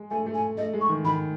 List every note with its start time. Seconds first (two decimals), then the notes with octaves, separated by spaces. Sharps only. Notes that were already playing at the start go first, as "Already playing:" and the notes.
Already playing: G#3
0.11 A3 G#5
0.26 A3
0.34 G#5
0.57 A3 D#5
0.73 G#3
0.81 C#6
0.89 D#3
1.04 D#3 B5